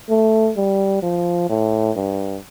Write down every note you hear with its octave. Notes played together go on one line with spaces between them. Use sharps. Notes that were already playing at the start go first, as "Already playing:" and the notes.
A3
G3
F3
A2
G2